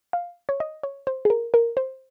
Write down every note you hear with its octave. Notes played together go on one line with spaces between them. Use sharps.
F5
C#5
D#5
C#5
C5
G#4
A#4
A#4
C5